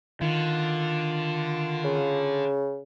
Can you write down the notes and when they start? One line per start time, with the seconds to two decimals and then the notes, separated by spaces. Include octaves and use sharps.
0.21 D3 D#3 F4
1.84 C#3